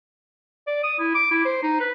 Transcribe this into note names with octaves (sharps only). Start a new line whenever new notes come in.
D5
D#6
E4
D6
E4
C5
D#4
B4